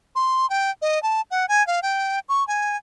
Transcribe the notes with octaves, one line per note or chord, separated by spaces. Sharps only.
C6
G5
D#5
A5
F#5
G#5
F5
G5
C#6
G#5